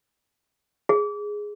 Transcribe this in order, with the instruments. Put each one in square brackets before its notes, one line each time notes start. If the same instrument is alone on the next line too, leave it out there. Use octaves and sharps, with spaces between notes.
[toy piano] G#4